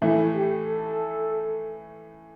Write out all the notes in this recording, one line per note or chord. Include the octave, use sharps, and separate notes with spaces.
A2 E3 A3 E4
G4
A4